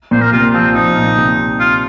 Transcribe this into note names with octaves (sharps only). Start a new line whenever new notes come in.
A#2 C5
A#4
C3 F4
F3 C4
F3 D#4
A#2
C3
F4